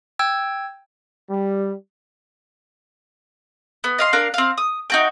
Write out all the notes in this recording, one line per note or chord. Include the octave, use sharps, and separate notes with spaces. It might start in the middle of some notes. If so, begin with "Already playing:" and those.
G5 E6 G#6
G3
B3
D#5 F5 C6
D4 A#4 F5
C4 F5
D#6
D#4 F#4 G5